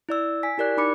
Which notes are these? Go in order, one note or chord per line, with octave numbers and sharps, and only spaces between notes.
E4 D5 E6
G#5 B6
E4 G4 A#4 D5 F#6
D#4 B5 D6 C#7